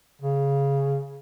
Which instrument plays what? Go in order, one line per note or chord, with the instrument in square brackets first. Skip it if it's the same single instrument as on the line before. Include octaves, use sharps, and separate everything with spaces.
[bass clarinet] C#3